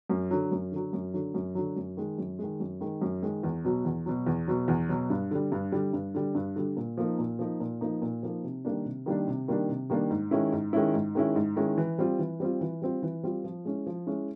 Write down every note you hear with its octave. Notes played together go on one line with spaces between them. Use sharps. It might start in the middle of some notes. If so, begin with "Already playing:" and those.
F#2
D3 F#3
F#2
D3 F#3
F#2
D3 F#3
F#2
D3 F#3
F#2
D#3 G#3
F#2
D#3 G#3
F#2
D#3 G#3
F#2
D#3 G#3
E2
B2 F#3
E2
B2 F#3
E2
B2 F#3
E2
B2 F#3
G2
D3 G3
G2
D3 G3
G2
D3 G3
G2
D3 G3
A#2
F3 A#3 D#4
A#2
F3 A#3 D#4
A#2
F3 A#3 D#4
A#2
F3 A#3 D#4
C3
D#3 G3 A#3 D4
C3
D#3 G3 A#3 D4
C3
D#3 G3 A#3 D4
C3
D#3 G3 A#3 D4
G#2
D#3 G#3 C#4 E4
G#2
D#3 G#3 C#4 E4
G#2
D#3 G#3 C#4 E4
G#2
D#3 G#3 C#4 E4
E3
G3 C4 F4
E3
G3 C4 F4
E3
G3 C4 F4
E3
G3 C4 F4
F3
G#3 C#4 E4
F3
G#3 C#4 E4